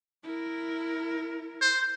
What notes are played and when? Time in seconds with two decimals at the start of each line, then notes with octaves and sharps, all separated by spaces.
0.24 E4 A#4
1.61 C5